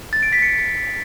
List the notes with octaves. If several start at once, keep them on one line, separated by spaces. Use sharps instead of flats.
A6
D7
B6
C#7